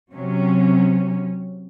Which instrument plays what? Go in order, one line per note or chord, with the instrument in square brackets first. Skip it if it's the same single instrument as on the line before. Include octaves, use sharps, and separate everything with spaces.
[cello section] C3 F#3 C#4